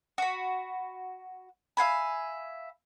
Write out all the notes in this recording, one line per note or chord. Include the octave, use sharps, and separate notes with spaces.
F#4 B5
E5 F5 G#5 B5